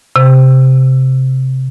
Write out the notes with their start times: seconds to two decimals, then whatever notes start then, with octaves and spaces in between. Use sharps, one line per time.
0.16 C3